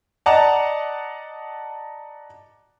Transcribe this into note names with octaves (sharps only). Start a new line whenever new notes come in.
D5 D#5 F#5 A5 A#5